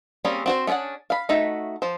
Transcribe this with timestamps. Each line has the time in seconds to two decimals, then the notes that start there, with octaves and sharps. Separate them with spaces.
0.25 G3 A#3 C4 C#4 G#4
0.46 C4 F#4 C5
0.67 A3 C#4 D4 G#4 F#5
1.10 F5 B5
1.29 A3 D#4 F#4 E5
1.82 F3 C5